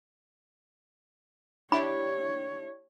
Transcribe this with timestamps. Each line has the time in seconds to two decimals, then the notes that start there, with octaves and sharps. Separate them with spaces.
1.72 D4 E4 G4 C#5 B5